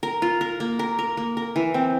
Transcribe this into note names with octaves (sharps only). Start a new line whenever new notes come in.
A#4
F4
A#4
A#3
A#4
A#4
A#3
A#4
E3
C4